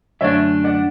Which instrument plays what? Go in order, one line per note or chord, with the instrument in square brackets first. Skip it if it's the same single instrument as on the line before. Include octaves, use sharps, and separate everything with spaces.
[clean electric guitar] F#2 D3 A3 D4 [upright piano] C#5 E5
[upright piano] D5 F#5